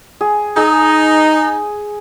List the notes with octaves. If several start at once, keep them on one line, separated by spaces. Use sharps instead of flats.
G#4
D#4 G#4